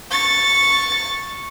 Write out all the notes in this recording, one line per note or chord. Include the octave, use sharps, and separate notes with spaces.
C#6 A6